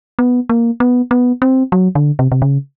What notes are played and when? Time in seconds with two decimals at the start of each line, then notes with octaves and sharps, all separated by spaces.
0.19 B3
0.49 A#3
0.80 B3
1.11 B3
1.42 C4
1.72 F#3
1.95 D3
2.19 C3
2.32 C3
2.42 C#3